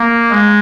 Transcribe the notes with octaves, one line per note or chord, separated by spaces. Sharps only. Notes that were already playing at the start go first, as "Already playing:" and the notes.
Already playing: A#3
G#3